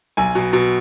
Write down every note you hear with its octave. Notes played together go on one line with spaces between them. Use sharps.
B1 G#5
B2
B2